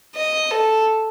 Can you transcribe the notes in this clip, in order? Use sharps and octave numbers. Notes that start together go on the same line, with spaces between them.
D#5
A4